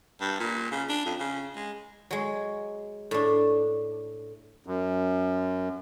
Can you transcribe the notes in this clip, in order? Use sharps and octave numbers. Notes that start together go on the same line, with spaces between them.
G2
A#2
C#3
D4
F2
C#3
G#3
F#3 G#3
A2 D4
F#2